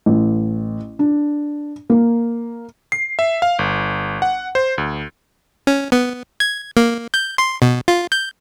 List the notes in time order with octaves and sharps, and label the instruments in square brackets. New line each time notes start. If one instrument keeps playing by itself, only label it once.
[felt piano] A1
D4
A#3
[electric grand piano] C7
E5
F5
G1
F#5
C5
D2
[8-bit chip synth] C#4
B3
G#6
A#3
G6
C6
B2
F4
G6